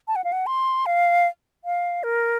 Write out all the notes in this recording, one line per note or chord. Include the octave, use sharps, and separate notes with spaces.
A5
F#5
F5
F#5
C6
F5
F5
A#4